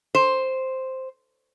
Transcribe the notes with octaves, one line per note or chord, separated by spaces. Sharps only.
C5